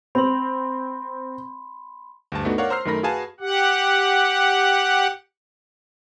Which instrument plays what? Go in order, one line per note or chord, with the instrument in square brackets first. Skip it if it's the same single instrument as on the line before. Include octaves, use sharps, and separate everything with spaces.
[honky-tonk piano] C4 [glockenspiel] B5 C6
[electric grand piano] D2 G2 A5
A3 B3 D4 D#4 F#4
A#4 C#5 D5 F5 F#5
C5 A#5 E6 F6 C7
F#2 D#3 A3 A#4 B5 A#6
F#4 G#4 B4 F5 G#5 A5
[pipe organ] G4 F#5